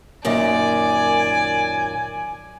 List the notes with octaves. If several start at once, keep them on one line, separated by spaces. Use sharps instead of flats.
F#2 A#2 D#3 D5 G#5